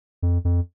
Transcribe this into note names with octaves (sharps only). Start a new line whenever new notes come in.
F2
F2